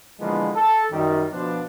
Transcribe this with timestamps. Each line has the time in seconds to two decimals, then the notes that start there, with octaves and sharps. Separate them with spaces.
0.20 D3 E3 F3 G#3 A#3 B3
0.54 A4
0.91 F#2 D#3 G3
1.32 B2 F3 D4